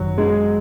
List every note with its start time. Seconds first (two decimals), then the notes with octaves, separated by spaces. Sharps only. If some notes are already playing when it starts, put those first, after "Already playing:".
Already playing: G#1 F#2 D#3 F#3
0.18 G#3